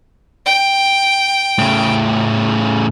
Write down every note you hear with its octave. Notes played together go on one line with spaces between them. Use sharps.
G5
A2 C#3